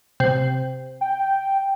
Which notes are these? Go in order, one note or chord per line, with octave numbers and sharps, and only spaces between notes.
C3
G5